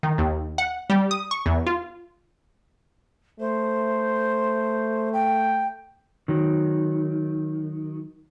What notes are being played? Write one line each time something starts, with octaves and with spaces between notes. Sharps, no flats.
D#3
D#2
F#5
G3
D#6
C#6
E2
F4
A3 C5
G5
D#3 F#3